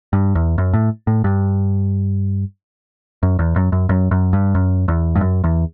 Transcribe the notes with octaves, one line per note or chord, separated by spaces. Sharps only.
G2
E2
F#2
A2
A2
G2
F#2
E2
F#2
F#2
F#2
F#2
G2
F#2
E2
G2
F#2
E2